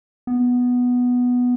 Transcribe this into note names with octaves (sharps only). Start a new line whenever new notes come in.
B3